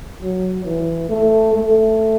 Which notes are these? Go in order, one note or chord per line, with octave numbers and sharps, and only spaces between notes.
F#3
E3
A3
A3